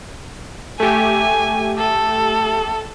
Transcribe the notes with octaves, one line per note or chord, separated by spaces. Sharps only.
A3 G4 G#5
A4